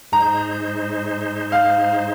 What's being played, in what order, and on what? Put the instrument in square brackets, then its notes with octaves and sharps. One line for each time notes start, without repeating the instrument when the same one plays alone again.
[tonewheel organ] G#2 G#3 D#4 C5 [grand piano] A#5
[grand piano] F5